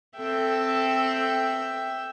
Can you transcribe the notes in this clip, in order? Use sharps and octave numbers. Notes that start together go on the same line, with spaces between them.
C4 A4 E5 G5